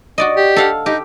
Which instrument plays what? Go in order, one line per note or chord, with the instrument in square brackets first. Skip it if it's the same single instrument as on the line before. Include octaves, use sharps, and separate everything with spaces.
[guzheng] F#4 D5 D#5
[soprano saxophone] G4
[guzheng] A4 F5 F#5
[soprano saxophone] D#4 [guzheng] G4